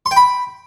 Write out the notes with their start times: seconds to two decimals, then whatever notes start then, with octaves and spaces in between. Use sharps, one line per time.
0.06 C6
0.11 G5
0.17 B5